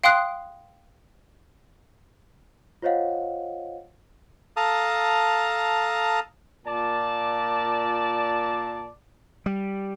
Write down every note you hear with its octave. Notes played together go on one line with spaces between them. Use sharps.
F5 G5 C6 D#6 F#6 C7
F4 C5 C#5 D#5 F5 F#5
A4 F5 A5 A#5 D#6
A#2 D5 A5
G3